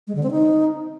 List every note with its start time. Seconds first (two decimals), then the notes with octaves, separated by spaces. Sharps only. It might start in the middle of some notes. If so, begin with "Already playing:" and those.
0.07 G#3
0.15 D3
0.23 C4
0.31 D#4